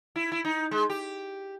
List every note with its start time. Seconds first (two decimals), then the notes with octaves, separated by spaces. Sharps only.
0.16 E4
0.32 E4
0.45 D#4
0.71 G#3
0.90 G4